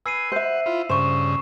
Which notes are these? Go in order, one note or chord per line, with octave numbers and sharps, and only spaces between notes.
B4 G#5 E6 C7 D#7
C5 E5 F#5
E4 F4
G2 C#3 C5 C#6 E7